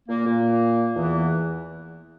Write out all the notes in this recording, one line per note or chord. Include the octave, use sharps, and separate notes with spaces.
A#2 A#3
A#2 A#3
E2 E3